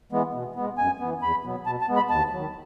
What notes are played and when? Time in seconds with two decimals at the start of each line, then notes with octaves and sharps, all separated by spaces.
0.12 E3 G#3 B3
0.34 B2
0.56 G#3 B3
0.78 F#2 G#5
1.00 E3 B3
1.22 E2 B5
1.44 B2 F#3 B3
1.66 B2 A5
1.81 A5
1.88 G#3 B3
1.96 B5
2.10 D#2 A5
2.32 D#3 F#3